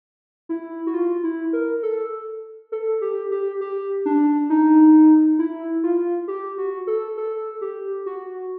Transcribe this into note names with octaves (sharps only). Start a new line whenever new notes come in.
E4
F#4
F4
E4
A#4
A4
A4
G4
G4
G4
D4
D#4
E4
F4
G4
F#4
A4
A4
G4
F#4